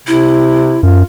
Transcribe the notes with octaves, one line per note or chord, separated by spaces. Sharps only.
C3 E4
F#2 F4